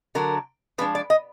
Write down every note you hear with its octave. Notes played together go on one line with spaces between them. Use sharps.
D3 F#3 D4 A#4
F3 G#3 D4 B4
D5
D#5